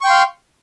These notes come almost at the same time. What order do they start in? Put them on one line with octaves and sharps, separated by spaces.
C#6 G5 C6 F5